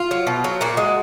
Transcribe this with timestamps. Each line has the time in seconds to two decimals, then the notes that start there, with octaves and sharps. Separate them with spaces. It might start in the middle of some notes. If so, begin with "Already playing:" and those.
Already playing: F4
0.11 F#3
0.27 B2
0.44 F#3
0.61 A#2 F#4
0.77 G#3